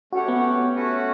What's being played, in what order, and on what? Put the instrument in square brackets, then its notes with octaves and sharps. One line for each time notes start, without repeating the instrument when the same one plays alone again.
[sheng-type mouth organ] A3 C#4 G4 C#5 F#5 [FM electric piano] F#4
[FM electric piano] B3
[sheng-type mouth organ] A3 C#4 F#4 B4 F#5